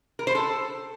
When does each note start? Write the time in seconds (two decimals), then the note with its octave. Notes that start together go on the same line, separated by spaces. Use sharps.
0.19 A#4
0.27 C5
0.35 A4